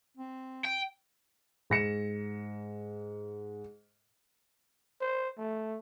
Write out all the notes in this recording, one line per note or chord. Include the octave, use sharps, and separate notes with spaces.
C4
G5
G#2 A#6 C#7 E7
C5
A3